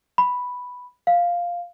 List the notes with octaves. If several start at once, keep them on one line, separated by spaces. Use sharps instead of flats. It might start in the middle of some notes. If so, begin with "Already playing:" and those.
B5
F5